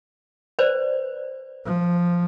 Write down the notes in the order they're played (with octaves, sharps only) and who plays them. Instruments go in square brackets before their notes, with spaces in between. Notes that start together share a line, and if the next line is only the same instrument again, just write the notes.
[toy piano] B4 C5 D5
[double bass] F3